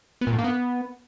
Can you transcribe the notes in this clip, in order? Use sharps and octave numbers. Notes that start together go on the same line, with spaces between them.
B3
A#2
A2
A#3
B3